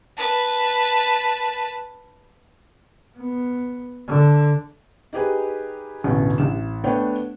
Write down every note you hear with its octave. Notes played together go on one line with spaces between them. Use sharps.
B4 A5
B3
D3
D#4 G4 G#4 B4
E1 A1 B2 D3 C#4
A1 E7
A3 B3 D4 B4 C#5 G5